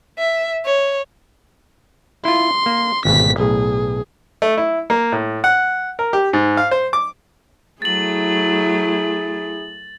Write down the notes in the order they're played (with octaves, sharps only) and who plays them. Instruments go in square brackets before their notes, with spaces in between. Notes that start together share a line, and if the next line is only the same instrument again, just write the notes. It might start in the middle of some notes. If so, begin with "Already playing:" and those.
[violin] E5
C#5
[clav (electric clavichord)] E4 F4 [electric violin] C6
[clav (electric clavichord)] A#3
[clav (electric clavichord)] G#1 D2 B2 [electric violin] B6
[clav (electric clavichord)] B1 A2 [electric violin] G#4
[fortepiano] A3
E4
A#3
A2
F#5
A#4
G4
G#2
F5
C5
D6
[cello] F#3 A3 [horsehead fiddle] E4 G#4 [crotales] A6 F#7